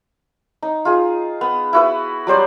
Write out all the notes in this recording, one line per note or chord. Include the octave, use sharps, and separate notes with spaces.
D#4
F4 G#4
B3
E4 F#4 B4
F#3 G3 C5 D5